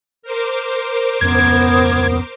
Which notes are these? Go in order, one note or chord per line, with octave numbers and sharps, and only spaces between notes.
A#4 C5 D6
D1 F2 B3 C#4 G#6